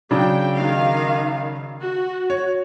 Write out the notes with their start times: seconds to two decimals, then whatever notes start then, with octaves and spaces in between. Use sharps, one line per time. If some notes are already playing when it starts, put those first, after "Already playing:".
0.11 C#3 F#3 D4 G5
0.54 D#3 F5
1.80 F#4
2.30 C#5